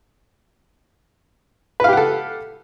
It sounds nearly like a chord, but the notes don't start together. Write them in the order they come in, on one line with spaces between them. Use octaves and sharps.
B4 F5 G4 F#5 A4